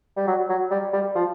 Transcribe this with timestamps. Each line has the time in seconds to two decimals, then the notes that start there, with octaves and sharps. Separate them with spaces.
0.17 G3
0.27 F#3
0.49 F#3
0.71 G3
0.93 G3
1.15 F3